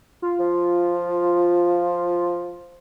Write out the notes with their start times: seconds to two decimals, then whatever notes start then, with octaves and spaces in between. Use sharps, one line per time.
0.22 F4
0.40 F3